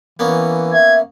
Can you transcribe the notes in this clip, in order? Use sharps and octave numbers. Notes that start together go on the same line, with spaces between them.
E3 A#3 B3 C#4
E5 G#6